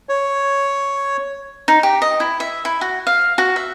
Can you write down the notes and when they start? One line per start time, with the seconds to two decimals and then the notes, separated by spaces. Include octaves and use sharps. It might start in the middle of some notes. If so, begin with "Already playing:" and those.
0.09 C#5
1.68 D#4
1.83 G4
2.02 D#5
2.20 E4
2.40 E5
2.65 E4
2.81 F#4
3.07 F5
3.38 F#4
3.56 E5